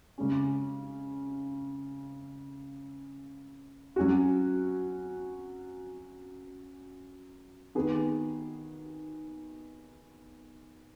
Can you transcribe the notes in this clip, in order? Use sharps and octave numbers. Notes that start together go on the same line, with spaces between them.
C#3 G#3 C#4
F#3 C#4 F#4
D#3 B3 G#4